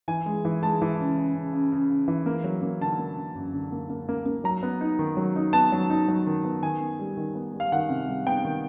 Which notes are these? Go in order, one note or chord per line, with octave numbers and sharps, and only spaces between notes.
E3 G#5
G#3
E3
G#3 A5
E3
C#3
C#3
C#3
C#3
C#3
C#3
E3
A#3
F#3
A#3
D3 A5
A#3
D3
F#2
D3
A#3
A#3
A#3
A#3
F#3 A#5
B3
D#4
D#3
F#3
D#4
B3 A5
F#3
D#4
F#3
D#3
B3
D#3 G#5
B3
G3
D#3
B3
G3
F5
D#3 F#5
C3
G3
B3 G5
D#3